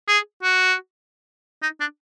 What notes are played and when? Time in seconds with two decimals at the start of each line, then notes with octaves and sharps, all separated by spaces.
0.08 G#4
0.43 F#4
1.62 D#4
1.80 D4